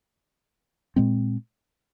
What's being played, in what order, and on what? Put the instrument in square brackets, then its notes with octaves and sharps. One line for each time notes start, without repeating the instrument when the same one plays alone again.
[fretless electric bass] A#2 G#3 C4